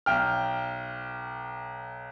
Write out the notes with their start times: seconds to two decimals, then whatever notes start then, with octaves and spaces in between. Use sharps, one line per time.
0.06 B1 G5 F6